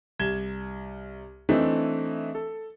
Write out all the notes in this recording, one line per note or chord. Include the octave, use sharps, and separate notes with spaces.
C2 G#6 E7 G7
E3 A3 C4 D4 D#4
A4